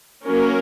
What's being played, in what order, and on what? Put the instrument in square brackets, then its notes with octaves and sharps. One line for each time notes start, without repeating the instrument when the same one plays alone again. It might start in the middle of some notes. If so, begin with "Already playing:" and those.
[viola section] F#3 A#3 C#4 A#4